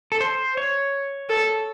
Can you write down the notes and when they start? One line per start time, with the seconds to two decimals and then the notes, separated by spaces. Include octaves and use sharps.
0.12 A4
0.21 C5
0.57 C#5
1.29 A4